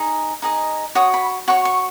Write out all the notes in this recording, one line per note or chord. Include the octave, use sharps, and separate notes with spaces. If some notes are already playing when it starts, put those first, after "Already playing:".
Already playing: D#4 G#4
D#4 G#4 D#5
F#4 C#5 D#6
B5
F#4 C#5 C#6
C#6